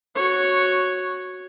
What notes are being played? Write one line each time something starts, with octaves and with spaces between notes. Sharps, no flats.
F#4 C#5